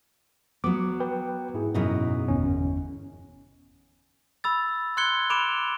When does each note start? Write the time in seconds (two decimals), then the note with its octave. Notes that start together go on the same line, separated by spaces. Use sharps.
0.64 F#3 B3 D6
1.00 B4 G5
1.54 G#2 E4 G#4
1.74 F#2 B2 D#4
2.28 G1 E2 C#4
4.44 B5 E6 A6
4.97 C6 F#6 G#6 C#7 G7
5.30 B5 D6 D7 E7 F7